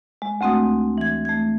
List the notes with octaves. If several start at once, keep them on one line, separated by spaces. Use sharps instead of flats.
G#3
D2 A3 C4 F#4 D#6
E3 G#6
A3 G#6